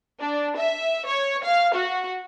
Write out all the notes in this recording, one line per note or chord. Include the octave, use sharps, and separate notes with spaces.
D4
E5
C#5
F5
F#4